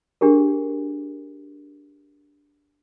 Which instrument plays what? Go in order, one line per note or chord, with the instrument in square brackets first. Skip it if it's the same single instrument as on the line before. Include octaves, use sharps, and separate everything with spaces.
[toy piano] D4 G4 G#4 A#4